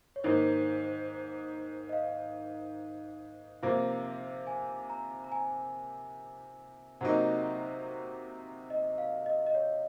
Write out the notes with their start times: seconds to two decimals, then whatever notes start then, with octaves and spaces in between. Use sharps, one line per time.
0.16 C#5
0.24 G#2 D#3 A#3 C5
1.89 D#5
1.93 F5
3.63 C3 F3 A#3 F5
4.47 G#5
4.90 A#5
5.24 A#5
5.32 G#5
7.01 C3 F#3 A#3 D#4 F#5
8.70 D#5
8.98 F5
9.26 D#5
9.46 D#5
9.55 C#5